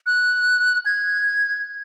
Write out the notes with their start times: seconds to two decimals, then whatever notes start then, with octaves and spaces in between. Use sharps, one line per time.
0.06 F#6
0.86 G#6